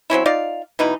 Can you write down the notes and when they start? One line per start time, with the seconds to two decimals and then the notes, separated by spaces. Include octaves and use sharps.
0.10 F#3 C4 C#4 E4
0.26 D#4 F4 D5 F5
0.79 B2 E3 D#4 B5